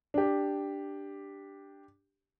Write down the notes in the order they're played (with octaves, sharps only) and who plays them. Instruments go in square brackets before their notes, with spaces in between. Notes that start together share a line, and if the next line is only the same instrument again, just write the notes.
[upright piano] D4 G4